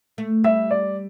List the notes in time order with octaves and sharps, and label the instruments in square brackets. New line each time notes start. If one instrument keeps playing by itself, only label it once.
[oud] A3
[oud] G3 [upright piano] E5
[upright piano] D5